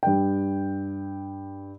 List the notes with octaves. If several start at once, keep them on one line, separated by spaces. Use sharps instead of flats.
G2 G5